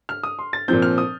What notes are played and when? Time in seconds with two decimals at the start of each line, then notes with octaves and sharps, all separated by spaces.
0.09 F6
0.23 D#6
0.39 C6
0.53 A6
0.68 A#2 F3 C4 G6
0.82 F6
0.98 D#6